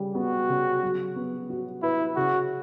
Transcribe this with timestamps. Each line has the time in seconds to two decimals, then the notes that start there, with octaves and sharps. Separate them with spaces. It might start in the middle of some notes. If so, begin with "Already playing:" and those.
Already playing: C#3 G3
0.15 B3 F#4
0.49 C#3
0.82 F#3
1.16 B3
1.50 F#4
1.83 E4 B4
2.16 C#3 F#4